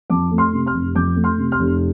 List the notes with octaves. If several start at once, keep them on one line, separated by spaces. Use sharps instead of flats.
F2 A5 D6
A3
C6 F6
C3
C6 F6
F1
F2 D6 G6
A3
C6 F6
C3
C6 F6
F1